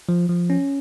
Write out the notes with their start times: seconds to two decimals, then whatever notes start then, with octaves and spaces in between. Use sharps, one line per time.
0.09 F3
0.29 F3
0.50 C#4